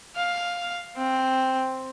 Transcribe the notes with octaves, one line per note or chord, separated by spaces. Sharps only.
F5
C4